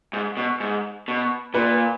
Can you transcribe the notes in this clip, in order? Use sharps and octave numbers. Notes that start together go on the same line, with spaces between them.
G#2
B2
G#2
B2
A#2 B4